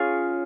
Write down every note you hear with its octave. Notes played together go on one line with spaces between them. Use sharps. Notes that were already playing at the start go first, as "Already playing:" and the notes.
Already playing: C#4 F4 G#4